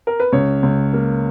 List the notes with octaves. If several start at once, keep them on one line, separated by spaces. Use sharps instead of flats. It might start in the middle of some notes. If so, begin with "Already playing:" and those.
A#4
B4
C#2 C#5
C#2
A#3